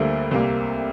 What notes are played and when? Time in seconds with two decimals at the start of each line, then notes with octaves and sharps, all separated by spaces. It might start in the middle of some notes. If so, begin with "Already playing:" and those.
Already playing: D2 D3 G3 A#3 C5 E5
0.31 C2 C3 G3 A#3